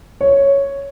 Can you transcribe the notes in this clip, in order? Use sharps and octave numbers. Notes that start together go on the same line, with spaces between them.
C#5